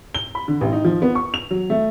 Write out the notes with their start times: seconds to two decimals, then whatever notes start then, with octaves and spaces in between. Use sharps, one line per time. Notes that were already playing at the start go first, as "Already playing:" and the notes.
0.15 G7
0.35 B5
0.48 D3
0.61 A1
0.73 D#4
0.85 F3
1.02 B3
1.15 C#6
1.34 F7
1.51 F#3
1.70 A3